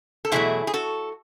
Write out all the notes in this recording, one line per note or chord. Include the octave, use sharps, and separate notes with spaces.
A4
E2 B2 F#3 A3 E4 G#4
G#4
F#4 A4